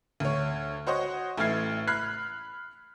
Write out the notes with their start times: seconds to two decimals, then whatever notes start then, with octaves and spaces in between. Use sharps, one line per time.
0.20 D2 C#5
0.87 F#4 C5 C#5 D#5 F#5
1.38 A1 A3 E4 F6 G#6 C7
1.87 B5 F6 F#6 G#6 C7